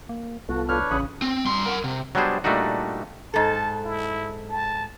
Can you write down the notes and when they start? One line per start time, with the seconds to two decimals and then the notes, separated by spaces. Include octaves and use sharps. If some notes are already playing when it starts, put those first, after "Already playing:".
0.09 A#3
0.49 C2 B3 F4 F#4 A4
0.69 D4 B4 C#5 F6
0.91 A1 C#3 B5 C#6 D#6 F#6
1.22 C4
1.46 G2 C6
1.66 A#4 F#5
1.84 C3
2.15 F#3 G3 B3 D4 G#4 C5
2.44 A#2 G3 A3 D4 D#4 F#4
3.34 G#2 A4 A5
3.84 E4
4.49 A5